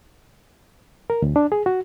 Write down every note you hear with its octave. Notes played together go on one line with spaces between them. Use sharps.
A#4
D2
D4
G#4
F#4